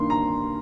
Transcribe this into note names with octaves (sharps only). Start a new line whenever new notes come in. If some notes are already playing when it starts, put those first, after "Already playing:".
Already playing: G2 D#3 A#3 D#4 C6
A#5